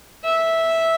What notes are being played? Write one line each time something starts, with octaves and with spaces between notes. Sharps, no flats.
E5